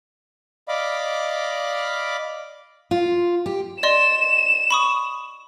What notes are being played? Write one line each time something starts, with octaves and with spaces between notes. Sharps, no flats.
D5 D#5 F5 B5 D6
F4
G4
D5 D#5 C6 E7
B5 C#6 D#6